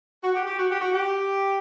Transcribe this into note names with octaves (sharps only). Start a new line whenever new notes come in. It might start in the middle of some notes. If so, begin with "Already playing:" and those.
F#4
G4
G4
F#4
G4
F#4
G4